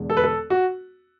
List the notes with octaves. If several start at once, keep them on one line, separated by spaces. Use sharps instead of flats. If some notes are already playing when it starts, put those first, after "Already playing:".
Already playing: E1 E2 D3 G#3
A4
B4
A4
F#4